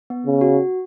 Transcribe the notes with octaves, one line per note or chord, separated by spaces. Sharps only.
B3
C#3
F#4